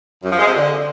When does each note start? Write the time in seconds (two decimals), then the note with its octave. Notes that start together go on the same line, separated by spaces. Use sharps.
0.23 F#2
0.31 F3
0.39 G#3
0.47 C3
0.55 D3